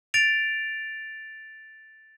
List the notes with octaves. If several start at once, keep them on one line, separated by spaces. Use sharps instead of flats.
A6 D7 F7